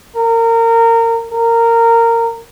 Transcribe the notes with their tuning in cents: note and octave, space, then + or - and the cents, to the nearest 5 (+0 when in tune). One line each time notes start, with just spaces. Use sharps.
A#4 -25
A#4 -15